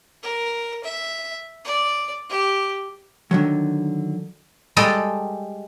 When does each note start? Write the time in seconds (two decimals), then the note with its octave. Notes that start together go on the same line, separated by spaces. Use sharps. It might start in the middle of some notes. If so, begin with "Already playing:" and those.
0.23 A#4
0.84 E5
1.65 D5
2.29 G4
3.31 D3 D#3 F#3
4.76 G3 G#3 A4 D#5 G5